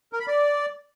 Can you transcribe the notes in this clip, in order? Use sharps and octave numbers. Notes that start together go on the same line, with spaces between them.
A#4
B5
D5